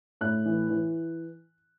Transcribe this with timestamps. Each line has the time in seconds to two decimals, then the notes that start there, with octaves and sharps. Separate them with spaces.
0.21 A2 F#6
0.45 E3
0.70 E3